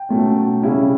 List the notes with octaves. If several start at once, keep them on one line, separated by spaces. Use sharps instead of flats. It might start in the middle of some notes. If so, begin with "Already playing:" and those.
Already playing: G5
B2 F#3 A3 C#4
C#3 G3 C#4 E4